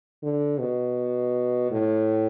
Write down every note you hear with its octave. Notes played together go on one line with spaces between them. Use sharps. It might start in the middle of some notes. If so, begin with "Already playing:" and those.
D3
B2
A2